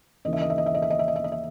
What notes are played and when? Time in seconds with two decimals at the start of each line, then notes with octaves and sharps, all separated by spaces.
0.25 D#2 C#3 E3 D#5
0.33 E5
0.42 D#5
0.50 E5
0.58 D#5
0.66 E5
0.74 D#5
0.82 E5
0.90 D#5
0.99 E5
1.08 D#5
1.16 E5
1.24 D#5
1.32 E5